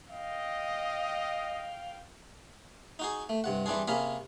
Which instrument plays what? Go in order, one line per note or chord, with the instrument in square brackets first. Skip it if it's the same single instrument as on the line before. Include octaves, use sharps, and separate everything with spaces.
[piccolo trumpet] D#5 [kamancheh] F5 G5
[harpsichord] D#4 F#4 G#4
A3
G2 C3 F#5
E3 G3 C4 D4 G#4
C3 A#3 C#4 G#4 A#4 B5